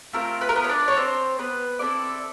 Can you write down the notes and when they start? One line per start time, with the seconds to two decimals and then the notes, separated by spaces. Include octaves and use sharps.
0.13 A3 C4 F4 A#4
0.41 B4
0.49 A#4
0.55 B3 B4
0.64 C#5
0.69 D4 D5
0.88 C#5
0.96 C4 C5
1.39 B3 B4
1.79 C4 D4 E4 A4 D5